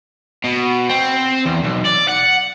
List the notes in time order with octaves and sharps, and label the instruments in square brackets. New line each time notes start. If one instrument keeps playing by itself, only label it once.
[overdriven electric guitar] B2
C4
E2
B1
D5
F#5